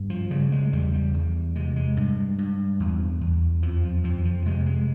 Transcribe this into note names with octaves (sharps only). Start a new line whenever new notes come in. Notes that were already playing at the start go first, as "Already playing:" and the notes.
Already playing: G2
F3
C#3 G3
G#3
E2 G3
G3
E2
C3 G#3
G#3
G2
G2
E2
E2
F2 F3
F3
F2 F3
F3
C3 G#3
G#3